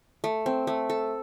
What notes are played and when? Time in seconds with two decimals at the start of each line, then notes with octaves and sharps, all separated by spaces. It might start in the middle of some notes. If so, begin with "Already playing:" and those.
0.24 A3
0.46 C4
0.67 A3
0.90 A4